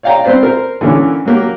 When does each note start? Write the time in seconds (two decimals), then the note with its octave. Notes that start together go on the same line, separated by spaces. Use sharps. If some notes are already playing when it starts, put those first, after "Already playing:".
0.03 C#5 D5 F5 G5 A#5
0.24 C4 B4 C5 D5
0.43 A#4 C5
0.81 D3 E3 A#3 C#4
1.25 F#3 A#3 G4